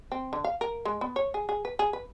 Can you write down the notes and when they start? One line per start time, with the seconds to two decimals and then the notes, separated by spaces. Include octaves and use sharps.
0.12 C4
0.33 D3
0.44 F5
0.61 A#4
0.85 G#3
1.01 B3
1.16 C#5
1.34 G#4
1.49 G#4
1.65 B4
1.79 G#4
1.93 B4